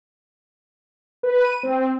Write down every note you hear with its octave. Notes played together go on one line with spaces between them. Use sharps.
B4
D#7
C4